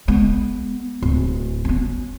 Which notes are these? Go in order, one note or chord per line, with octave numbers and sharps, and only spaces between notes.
G#3 B3
D1
B3 C#4